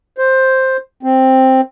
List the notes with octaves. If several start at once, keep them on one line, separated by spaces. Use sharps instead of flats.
C5
C4